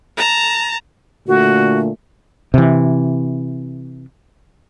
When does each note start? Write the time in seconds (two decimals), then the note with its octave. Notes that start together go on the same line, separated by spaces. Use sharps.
0.17 A5 A#5
1.28 A#2 D3 A3 F#4
2.54 C3 E3